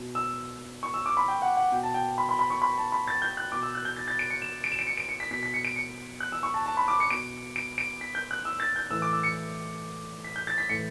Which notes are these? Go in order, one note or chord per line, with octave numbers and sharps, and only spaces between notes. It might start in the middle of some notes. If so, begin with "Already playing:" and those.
Already playing: B2
E6
C#6
E6
D6
B5
G5
F#5
F#5
B2 G5
A5
G5
B5
B5
B5
C#6
B5
A5
B5
A6
G6
F#6
B2 D6
E6
F#6
G6
A6
A6
D7
C#7
E7
D7
E7
D7
C#7
D7
C#7
B6
B2 B6
B6
C#7
D7
C#7
F#6
E6
C#6
A5
A5
B5
D6
C#7
B2 D7
D7
D7
B6
G6
F#6
E6
A6
G6
A2 E3 E6
D6
E6
C#7
B6
G6
A6
B6
A2 E3 C#7